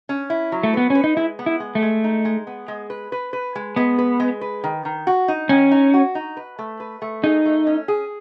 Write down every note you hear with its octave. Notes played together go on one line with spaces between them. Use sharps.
C#4
E4
F#3
A3
B3 B4
C#4 B4
D#4
G#3 E4
B3
E4
G#3
A3
G#3
D#4
G#3
B3
G#3
B4
B4
B4
G#3
G#3 B3
B4
G#3
B4
D#3
D#3
F#4
D#4
D#3 C#4
D#4
F#4
D#4
B4
A3
B4
A3
D#4 G#4
A3
C#4
G#4